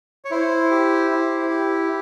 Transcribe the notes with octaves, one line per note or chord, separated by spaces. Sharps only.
C#5
E4 C5
G4
E4
G4